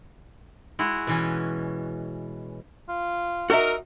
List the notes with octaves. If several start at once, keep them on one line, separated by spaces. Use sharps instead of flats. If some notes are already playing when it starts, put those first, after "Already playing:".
G#3 E4 F#4
B2 E3 C#4
F4
D#4 F#4 A#4 E5